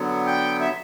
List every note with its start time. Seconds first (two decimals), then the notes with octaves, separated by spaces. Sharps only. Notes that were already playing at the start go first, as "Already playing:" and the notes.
Already playing: D3 F#3 B3
0.27 G5
0.60 E5